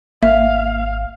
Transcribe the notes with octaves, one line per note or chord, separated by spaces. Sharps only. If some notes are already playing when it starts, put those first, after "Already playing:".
G#1 A#3 E5 F5